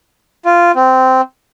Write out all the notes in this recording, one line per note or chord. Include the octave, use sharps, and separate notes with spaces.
F4
C4